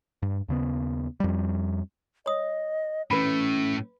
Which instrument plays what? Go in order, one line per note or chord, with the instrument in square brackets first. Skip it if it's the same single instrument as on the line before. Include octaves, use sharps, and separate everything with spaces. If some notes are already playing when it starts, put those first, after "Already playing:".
[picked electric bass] G2
D#2 C#3 B3
F2 G3
[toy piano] C#5 D#6 [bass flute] D#5
[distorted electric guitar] A2 A3 [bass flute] E3 [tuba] C#4 [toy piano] B4 B5